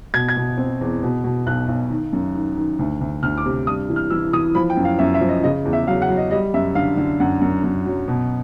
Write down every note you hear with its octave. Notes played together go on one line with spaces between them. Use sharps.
B2 G#6
G#6
B2
C4
E2
B2
B2
B1 F#6
B1
D#3
F#2
D#3
D#3
D2
D2
D2 F6
D6
C3
G2 D#6
E3
F6
E3 E6
E3 D#6
F3 B5
G5
F#2
F5
F#2 E5
E5
F3
D#5
C#3 D#5
E2
E5
F#3 F5
F#5
F#3
D#5
G3 D#5
F#2 E5
D3 F5
D3
F#2 F#5
F#2
F#2
F#3
B2